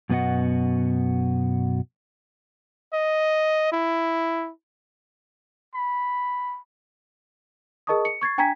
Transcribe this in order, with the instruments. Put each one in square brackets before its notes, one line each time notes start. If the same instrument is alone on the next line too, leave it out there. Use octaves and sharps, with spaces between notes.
[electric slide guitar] F#2 B2 B3 F#4 D#5 F#5
[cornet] D#5
E4
B5
[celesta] G#4 A#4 D#5 A5 C#6 D#6
C#7
C#6 G#6 A6 C7
D4 G5 G#5 A#5 G#6 B6